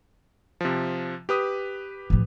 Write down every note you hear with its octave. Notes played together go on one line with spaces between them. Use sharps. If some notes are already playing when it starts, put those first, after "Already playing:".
C3 F3
G4 B4 D#6
A1 F3